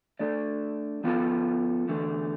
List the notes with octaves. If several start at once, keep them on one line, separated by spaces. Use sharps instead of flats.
A3 D4 A4 D5
F3 B3 F4 A4
E2 D3 A3